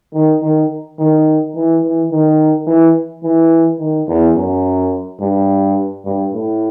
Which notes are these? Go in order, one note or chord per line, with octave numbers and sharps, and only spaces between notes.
D#3
D#3
D#3
E3
E3
D#3
E3
E3
D#3
E2
F#2
G2
G2
A2